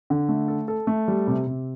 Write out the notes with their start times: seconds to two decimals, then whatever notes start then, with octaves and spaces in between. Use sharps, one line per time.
0.10 D3
0.29 A3
0.48 A4
0.68 A4
0.87 A3
1.08 G3
1.27 C3
1.47 C3